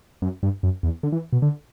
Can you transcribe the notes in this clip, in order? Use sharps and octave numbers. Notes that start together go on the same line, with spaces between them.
F#2
G2
F#2
E2
D3
E3
B2
D3